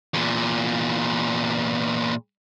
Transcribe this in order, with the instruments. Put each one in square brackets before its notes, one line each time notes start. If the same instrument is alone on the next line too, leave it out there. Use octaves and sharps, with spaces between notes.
[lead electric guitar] E2 A#2